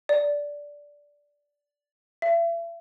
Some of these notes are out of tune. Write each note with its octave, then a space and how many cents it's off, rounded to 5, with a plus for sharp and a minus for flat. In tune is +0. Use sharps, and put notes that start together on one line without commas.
D5 -10
E5 +40